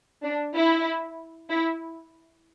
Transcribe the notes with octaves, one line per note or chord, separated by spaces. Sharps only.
D4
E4
E4